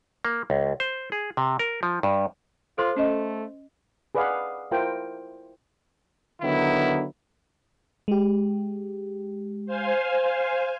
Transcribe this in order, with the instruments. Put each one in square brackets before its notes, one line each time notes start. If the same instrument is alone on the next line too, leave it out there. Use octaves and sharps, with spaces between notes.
[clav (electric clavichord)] A#3
C#2
C5
G#4
C3
A#4
F3
G2
[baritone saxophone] F4 [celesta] A4 C5 C6
[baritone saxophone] A3 [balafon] C#4 D#5
[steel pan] G#4 B4 D5 D#5 F5 F#5
E4 F4 A#4 C5 G5
[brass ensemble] D3 D#3 F#3 B3 E4
[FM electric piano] G#3 G4
[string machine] C5 F5 G#5